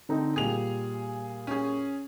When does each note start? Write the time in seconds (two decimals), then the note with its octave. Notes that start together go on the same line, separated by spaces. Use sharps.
0.09 D3 C4 D#4
0.36 A#2 G3 G#4 F7
1.47 C#4 G#4